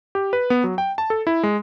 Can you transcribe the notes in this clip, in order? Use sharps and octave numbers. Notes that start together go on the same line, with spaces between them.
G4
B4
B3
F#3
G5
A5
A4
E4
G#3